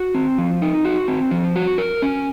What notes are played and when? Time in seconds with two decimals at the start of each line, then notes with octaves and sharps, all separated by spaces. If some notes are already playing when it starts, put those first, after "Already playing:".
Already playing: F#4
0.15 C4
0.38 F3
0.62 D#4
0.85 F#4
1.08 C4
1.31 F3
1.56 F#4
1.78 A#4
2.02 C#4